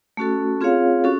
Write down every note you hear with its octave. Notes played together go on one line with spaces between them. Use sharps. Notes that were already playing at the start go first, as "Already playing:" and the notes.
A3 C#4 F#4 A4
C4 F4 G#4 C#5 F5
C#4 F#4 A4